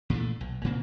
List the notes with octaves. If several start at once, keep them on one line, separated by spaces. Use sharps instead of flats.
A#2 E3 F#3 A3
B1
A#2 C#3 A#3 C4